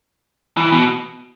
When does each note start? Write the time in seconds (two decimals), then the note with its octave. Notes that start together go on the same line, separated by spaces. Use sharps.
0.57 E3
0.72 B2